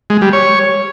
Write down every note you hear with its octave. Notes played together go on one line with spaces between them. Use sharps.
G#3
G3
C#5